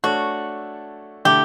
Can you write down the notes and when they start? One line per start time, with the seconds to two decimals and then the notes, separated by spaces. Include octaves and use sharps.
0.04 A3 D4 F#4 A4 C#5
1.25 D3 A3 E4 G4